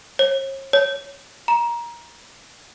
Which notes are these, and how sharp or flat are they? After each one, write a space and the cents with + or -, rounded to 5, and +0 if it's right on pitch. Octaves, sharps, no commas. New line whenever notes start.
C#5 -45
C#5 +10
A#5 +20